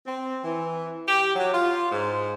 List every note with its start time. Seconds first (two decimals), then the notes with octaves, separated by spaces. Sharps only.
0.05 C4
0.43 E3
1.07 G4
1.36 F#3
1.52 F4
1.92 G#2